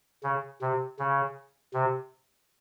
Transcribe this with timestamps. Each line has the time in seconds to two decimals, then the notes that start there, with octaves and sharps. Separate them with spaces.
0.23 C#3
0.61 C3
0.99 C#3
1.74 C3